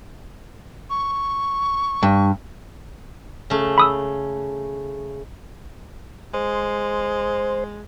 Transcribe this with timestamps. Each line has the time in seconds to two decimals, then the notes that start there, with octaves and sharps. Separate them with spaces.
0.90 C#6
2.03 G2
3.50 C#3 A3
3.78 B5 D#6 E6
6.34 G#3 C5